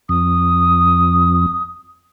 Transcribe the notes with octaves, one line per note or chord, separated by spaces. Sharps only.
F2 D#6